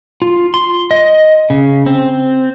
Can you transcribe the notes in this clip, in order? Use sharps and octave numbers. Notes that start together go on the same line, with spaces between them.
F4
C6
D#5
C#3
C4